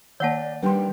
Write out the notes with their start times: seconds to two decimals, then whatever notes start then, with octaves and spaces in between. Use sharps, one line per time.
0.20 D#3 A#3 C#5 D5 F#5 A5
0.63 D#3 G3 D4 B4 G5 C6